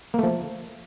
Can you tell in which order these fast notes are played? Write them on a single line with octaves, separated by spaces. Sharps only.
A#3 A3 F3